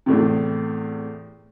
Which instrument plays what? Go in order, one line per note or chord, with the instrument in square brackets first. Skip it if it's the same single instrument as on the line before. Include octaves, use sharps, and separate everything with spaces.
[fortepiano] E2 A2 C3